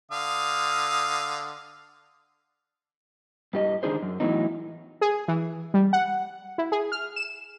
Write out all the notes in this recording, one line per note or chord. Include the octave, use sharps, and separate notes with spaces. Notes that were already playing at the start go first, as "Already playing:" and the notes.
D3 F5 D#6
G2 G4 D#5
D3 D#3 D4 D#4 G#4 C5
F#2
A2 E3 F#3 B3 D#4
G#4
E3
G3
F#5
E4
G#4
F6
E7